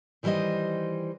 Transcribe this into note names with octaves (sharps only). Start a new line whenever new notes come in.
D#3 E3 G3 F4 C5 D#5